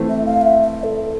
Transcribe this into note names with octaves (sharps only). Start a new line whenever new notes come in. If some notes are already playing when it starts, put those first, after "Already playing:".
Already playing: E3 A3 C4
E5
F5
E5
E5
A4